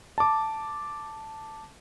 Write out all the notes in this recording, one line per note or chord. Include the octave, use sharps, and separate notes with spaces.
A5 D6